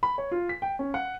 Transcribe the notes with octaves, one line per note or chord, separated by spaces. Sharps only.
B5
C#5
F4
B6
G5
C#4
F#5